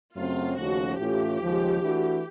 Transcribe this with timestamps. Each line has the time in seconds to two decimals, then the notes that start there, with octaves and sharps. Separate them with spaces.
0.16 F#2 C#3 F#3 A3 C4 F4
0.57 D#2 C#3 F3 A3 C#4 F#4
0.98 A2 E3 A3 C#4 F4 G4
1.39 D#2 C#3 F3 G#3
1.80 E3 A3 D4 F#4